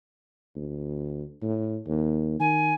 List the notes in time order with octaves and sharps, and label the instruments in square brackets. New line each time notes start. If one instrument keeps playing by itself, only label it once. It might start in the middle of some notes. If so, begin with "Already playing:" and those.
[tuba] D2
A2
D#2
[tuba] D#3 [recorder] G#5